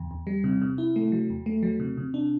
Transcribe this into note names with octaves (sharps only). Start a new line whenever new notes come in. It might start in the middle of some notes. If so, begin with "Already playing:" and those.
Already playing: E2
E2
G3
C3
C3
E4
A3
F#3
E2
A3
F#3
C3
C3
D4